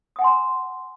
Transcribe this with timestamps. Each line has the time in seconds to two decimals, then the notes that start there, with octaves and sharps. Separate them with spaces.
0.16 D#6
0.19 F#5
0.21 G#5
0.24 C6
0.27 A#5